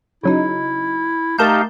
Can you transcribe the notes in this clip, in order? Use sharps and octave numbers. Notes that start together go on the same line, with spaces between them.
C#3 F#3 D#4 E4
A3 D#4 G4 A#4 F5 A5 G6